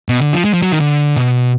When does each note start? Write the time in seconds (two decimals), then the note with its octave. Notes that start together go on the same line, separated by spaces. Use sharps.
0.09 B2
0.21 D3
0.33 F3
0.45 G#3
0.54 F3
0.62 F#3
0.72 D#3
0.80 D3
1.16 B2